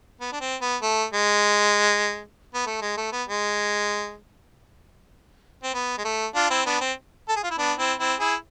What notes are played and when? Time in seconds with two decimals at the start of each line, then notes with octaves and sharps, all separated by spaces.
0.21 B3
0.33 D4
0.41 C4
0.61 B3
0.82 A3
1.13 G#3
2.55 B3
2.66 A3
2.82 G#3
2.97 A3
3.12 B3
3.29 G#3
5.63 C4
5.74 B3
5.98 G#3
6.05 A3
6.35 D4 F4
6.50 C4 E4
6.66 B3 D4
6.81 C4
7.29 A4
7.37 G#4
7.43 F4
7.51 E4
7.58 B3 D4
7.78 C4 E4
7.99 C4 E4
8.20 E4 G#4